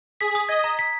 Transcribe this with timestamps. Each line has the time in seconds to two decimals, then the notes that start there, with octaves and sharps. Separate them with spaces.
0.21 G#4 B6
0.35 D#6
0.49 D#5 G#6
0.64 A#5
0.79 B6